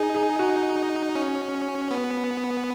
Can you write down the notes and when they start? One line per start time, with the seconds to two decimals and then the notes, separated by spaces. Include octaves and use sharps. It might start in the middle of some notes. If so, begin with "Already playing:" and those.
Already playing: D#4 G#4
0.15 G#4
0.39 F#4
1.15 C#4
1.91 B3